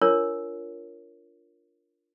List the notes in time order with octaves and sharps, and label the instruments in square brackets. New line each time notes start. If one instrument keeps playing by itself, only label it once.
[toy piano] D4 F4 A#4 C#5